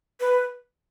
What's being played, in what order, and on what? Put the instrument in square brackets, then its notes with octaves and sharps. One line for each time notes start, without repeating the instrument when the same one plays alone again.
[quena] B4